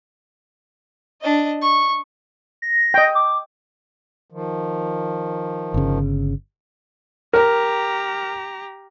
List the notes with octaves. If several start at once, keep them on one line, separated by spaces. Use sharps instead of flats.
D4 D#5
C#6
A#6
D#5 G5
D6
D#3 F3
G1 C#3
G4 A#4 A#5